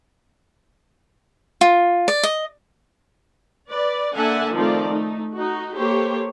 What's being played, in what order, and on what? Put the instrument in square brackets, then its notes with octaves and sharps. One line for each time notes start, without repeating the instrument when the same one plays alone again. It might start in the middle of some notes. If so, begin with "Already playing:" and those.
[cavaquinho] F4
D5
D#5
[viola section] B4 D5
D3 A#3 E5 F#5 G#5 A5
D#3 F3 A3 C4 F4 D5
A3 D#4
D#4 F#4
A#3 G4 A4 C5 C#5